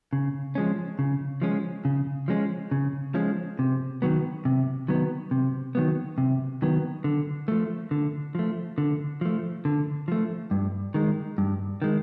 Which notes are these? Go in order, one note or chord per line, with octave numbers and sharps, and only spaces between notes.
C#3
F3 G#3 C#4
C#3
F3 G#3 C#4
C#3
F3 G#3 C#4
C#3
F3 G#3 C#4
C3
D#3 F#3 B3
C3
D#3 F#3 B3
C3
D#3 F#3 B3
C3
D#3 F#3 B3
D3
F3 A3
D3
F3 A3
D3
F3 A3
D3
F3 A3
G2
D#3 G#3
G2
D#3 G#3